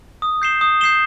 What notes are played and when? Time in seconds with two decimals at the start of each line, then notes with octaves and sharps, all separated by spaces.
0.22 D#6
0.42 G6 C7 E7 G7
0.61 D#6
0.81 G6 C7 E7 G7